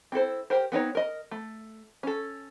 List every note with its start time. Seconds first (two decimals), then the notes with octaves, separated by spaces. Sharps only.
0.12 C4 E4 A4 C5
0.50 G4 A#4 C5
0.72 B3 C4 D#4 C#5
0.95 A#4 D#5
1.31 A3
2.03 C#4 A4